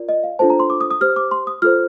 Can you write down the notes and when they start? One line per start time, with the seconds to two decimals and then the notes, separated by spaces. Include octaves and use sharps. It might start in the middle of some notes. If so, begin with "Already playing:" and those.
Already playing: F4 A#4 D5
0.09 D#5
0.23 F5
0.39 D4 F4 A4 C5 A5
0.50 A#5
0.60 C6
0.70 D6
0.81 D#6
0.91 D#6
1.01 G4 C5 F6
1.16 D6
1.31 C6
1.47 D#6
1.62 F4 A4 C5 F6